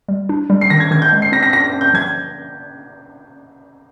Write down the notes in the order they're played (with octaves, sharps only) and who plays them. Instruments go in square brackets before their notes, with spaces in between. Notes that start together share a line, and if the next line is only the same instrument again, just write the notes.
[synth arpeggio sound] G3
D4
G3
[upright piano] C7
[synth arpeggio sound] D#3 [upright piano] A#6
[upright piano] G#6
[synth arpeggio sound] D#3 [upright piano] G#6
[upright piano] G6
[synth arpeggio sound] G#3
[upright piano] C7
[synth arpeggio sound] C4 [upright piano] A#6
[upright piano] A#6
[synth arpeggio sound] F4 [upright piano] A#6
[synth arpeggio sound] C4
[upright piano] G6
[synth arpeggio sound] F3 [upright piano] G#6